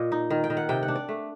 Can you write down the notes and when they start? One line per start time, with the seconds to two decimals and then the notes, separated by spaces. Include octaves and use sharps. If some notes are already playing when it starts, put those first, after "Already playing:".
Already playing: A#2 D#5
0.12 D#4
0.30 D#3
0.44 G5
0.50 D#3
0.57 F#5
0.69 C3 G5
0.83 F#5
0.88 D4
0.95 D5
1.09 A3